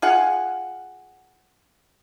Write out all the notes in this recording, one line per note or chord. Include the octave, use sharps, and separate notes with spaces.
F4 G#4 F5 F#5